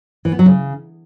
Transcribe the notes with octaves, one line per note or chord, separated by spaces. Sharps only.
E3
B3
F#3
C#3